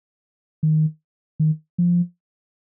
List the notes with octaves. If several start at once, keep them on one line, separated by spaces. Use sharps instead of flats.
D#3
D#3
F3